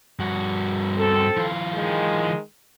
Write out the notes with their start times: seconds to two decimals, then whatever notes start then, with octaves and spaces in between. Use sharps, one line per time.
0.19 G2 F#4
0.98 C4 A4
1.37 E3 F4
1.74 D#3 G#3